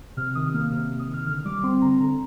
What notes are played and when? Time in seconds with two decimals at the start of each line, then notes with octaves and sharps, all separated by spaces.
0.17 C3 F6
0.35 D#3 D#6
0.54 A#3 F6
0.72 C3 F6
0.91 C3
0.99 D#6
1.08 D#3
1.13 F6
1.27 D3 F6
1.45 G3 D6
1.63 C4 C6
1.82 D3 A#5
2.00 D3 A#5